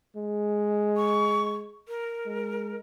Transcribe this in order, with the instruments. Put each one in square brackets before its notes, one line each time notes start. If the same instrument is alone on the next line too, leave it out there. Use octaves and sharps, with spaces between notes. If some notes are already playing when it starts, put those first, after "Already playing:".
[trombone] G#3
[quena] C#6
A#4
[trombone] G#3